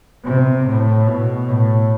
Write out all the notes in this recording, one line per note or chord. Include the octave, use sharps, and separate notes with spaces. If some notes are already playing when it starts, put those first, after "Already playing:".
C3
A2
B2
A2